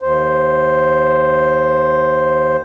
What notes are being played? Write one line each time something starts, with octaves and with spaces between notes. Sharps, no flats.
D#2 C5